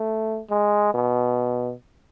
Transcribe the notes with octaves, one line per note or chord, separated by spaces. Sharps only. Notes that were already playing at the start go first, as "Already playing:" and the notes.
Already playing: A3
G#3
B2